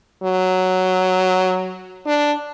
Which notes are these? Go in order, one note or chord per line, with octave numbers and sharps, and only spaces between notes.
F#3
D4